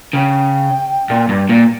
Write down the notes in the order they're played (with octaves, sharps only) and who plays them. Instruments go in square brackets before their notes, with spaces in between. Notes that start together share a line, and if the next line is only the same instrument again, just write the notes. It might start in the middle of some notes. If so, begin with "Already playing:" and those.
[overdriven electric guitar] C#3 [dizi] G5
[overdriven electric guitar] A#2
G2
A#2